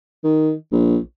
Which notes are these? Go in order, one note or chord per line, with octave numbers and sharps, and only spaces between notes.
D#3
A#1